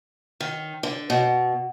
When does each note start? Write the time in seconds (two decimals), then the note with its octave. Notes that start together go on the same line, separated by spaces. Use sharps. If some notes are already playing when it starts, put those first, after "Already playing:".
0.40 D#3
0.83 D3
1.10 B2